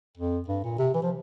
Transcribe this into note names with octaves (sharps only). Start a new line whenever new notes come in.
F2
G2
A#2
C3
E3
F3